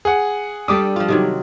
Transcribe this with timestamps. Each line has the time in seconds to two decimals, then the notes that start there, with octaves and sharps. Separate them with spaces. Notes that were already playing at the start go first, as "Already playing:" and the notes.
0.05 G#4 F#5
0.68 G3 D4 G4 A4 D6 D#6
0.96 F3 F4
1.08 C3 D#3 F#3